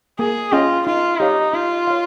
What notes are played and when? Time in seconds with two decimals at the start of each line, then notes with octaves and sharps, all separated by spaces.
0.19 A#3 G#4
0.52 C#4 F4 G#4 D#5 G5
0.86 D#4 F4
1.20 D#4 G4 C#5 F5
1.53 D#4 F4
1.87 C#5 F5